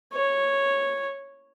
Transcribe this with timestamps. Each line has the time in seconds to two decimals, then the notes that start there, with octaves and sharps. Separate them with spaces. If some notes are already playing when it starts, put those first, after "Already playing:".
0.13 C#5